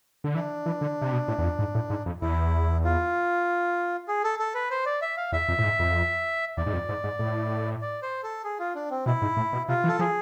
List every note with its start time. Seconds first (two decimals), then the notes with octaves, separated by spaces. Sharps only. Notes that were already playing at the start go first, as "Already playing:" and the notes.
0.24 D3
0.35 E3 D4
0.66 E3
0.81 D3
1.01 C3
1.12 B2
1.28 A2
1.38 E2
1.44 F2
1.59 G#2
1.75 A2
1.90 G#2
2.06 F2
2.21 E2 E4
2.84 F4
4.08 G#4
4.24 A4
4.39 A4
4.55 B4
4.71 C5
4.86 D5
5.02 E5
5.17 F5
5.32 E2 E5
5.48 F2
5.59 A2
5.64 G#2
5.79 F2
6.57 E2 D5
6.66 G#2
6.73 F2
6.89 G#2
7.04 G#2
7.19 A2
7.81 D5
8.03 C5
8.23 A4
8.44 G#4
8.59 F4
8.75 D4
8.91 C4
9.06 B2 E4
9.22 G#2
9.37 A2
9.53 B2
9.68 C3 F4
9.84 E3
9.89 A4
9.99 F3 G#4